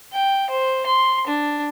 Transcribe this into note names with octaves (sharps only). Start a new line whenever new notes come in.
G5
C5
C6
D4